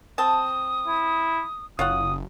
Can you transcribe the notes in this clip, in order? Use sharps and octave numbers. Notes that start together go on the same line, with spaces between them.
C4 A5 D#6
E4
F#1 F4 C#5 F#5 D#6